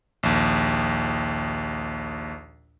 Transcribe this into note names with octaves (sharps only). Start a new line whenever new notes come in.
A#1 D#2